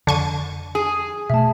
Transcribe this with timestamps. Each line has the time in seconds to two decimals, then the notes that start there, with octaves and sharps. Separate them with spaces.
0.07 F2 D3 C#6 D#7
0.75 G#4
1.30 B2 A3 E5 A5